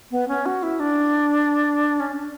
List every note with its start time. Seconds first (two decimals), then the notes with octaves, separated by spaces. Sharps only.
0.11 B3
0.28 C#4
0.46 F#4
0.63 E4
0.80 D4
2.00 C#4
2.13 D4